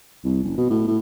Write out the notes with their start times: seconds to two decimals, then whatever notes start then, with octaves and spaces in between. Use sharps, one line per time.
0.24 C2
0.44 F#1
0.57 B2
0.70 A2
0.88 A2